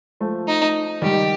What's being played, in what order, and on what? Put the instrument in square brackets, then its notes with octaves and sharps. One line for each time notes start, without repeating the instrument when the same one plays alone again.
[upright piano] F3 A3
[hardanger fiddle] D#4
[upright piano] D#3 G3 [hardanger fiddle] G4